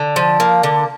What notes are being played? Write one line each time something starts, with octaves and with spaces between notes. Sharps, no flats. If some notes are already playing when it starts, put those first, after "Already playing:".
Already playing: D3
F3
A#3
D3